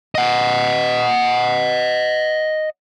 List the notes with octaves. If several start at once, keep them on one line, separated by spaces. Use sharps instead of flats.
D#5 F#5